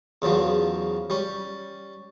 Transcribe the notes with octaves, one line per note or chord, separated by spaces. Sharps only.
E2 C#3 F3 F#3
G3 C#4